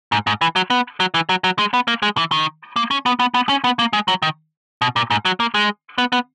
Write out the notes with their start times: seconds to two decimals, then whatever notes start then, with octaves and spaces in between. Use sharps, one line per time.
0.12 G#2
0.27 G#2
0.41 E3
0.56 F#3
0.70 B3
1.00 F#3
1.14 E3
1.29 F#3
1.44 F#3
1.59 G#3
1.74 B3
1.88 A#3
2.03 G#3
2.17 E3
2.32 D#3
2.76 A#3
2.91 C#4
3.06 B3
3.20 B3
3.34 B3
3.49 C#4
3.64 B3
3.79 A#3
3.93 G#3
4.08 F#3
4.22 D#3
4.82 B2
4.96 A#2
5.11 G#2
5.25 F#3
5.40 A#3
5.54 G#3
5.98 B3
6.12 B3